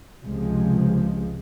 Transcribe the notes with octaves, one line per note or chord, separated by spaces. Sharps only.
C#2 C3 F3 G#3